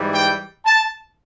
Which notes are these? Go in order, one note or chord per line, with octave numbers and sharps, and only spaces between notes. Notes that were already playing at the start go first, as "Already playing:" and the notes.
Already playing: G#2 E3 G3
G5
A5